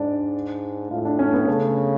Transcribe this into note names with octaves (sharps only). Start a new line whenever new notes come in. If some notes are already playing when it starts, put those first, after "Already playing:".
Already playing: G#2 D4 D5
A2 F4
D4
C#4
B3
C#3 A3